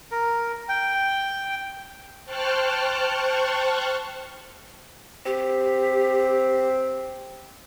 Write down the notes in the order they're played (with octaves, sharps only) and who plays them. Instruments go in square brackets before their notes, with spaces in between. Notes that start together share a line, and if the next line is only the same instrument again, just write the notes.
[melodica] A#4
G5
[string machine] C5 G5 A5 C#6 F6 F#6
[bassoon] C4 [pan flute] G4